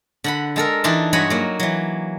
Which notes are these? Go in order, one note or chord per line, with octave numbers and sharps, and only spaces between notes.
D3 F#5 B5
G#3 A4 A#4
E3 D4 D#4 G5 A5 C6
G2 G#3 F#4 C#5 G#5 B5
F#3 A#3
E3 F#3